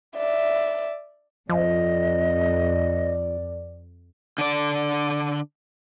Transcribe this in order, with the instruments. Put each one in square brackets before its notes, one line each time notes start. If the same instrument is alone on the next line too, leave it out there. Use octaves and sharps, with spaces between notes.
[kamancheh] D5 E5
[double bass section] F2 [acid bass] F3 [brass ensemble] D5 [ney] D#5
[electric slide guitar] D3 D5